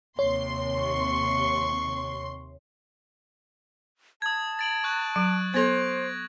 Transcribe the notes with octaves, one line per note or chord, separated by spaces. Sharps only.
D#2 C3 C#5 C6
C#6
A5 D#6 G#6
A6 D7 F#7
C#6 F#6 G#6
F#3 D7
B3 A4 C5 G#6 A#6 F7